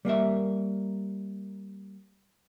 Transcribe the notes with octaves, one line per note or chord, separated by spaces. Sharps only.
G3 A#3 A#4 E5